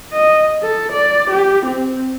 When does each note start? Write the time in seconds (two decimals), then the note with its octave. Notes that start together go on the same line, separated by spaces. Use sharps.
0.12 D#5
0.62 A4
0.92 D5
1.30 G4
1.65 C4